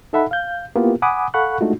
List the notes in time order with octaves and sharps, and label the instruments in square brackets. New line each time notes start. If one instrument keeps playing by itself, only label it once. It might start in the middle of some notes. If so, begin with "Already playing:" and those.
[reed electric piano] D#4 A4 E5 F#5 B5
F5 G6
A#3 B3 E4 F4 G4 A#4
F#5 G#5 B5 D6 D#6
A4 F5 F#5 B5 C#6 F#6
G#3 A3 D4 D#4 F4 F#4